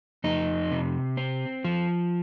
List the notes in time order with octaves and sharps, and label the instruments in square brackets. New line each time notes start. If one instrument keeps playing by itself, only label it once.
[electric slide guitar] F2 D#4
C3
C4
F3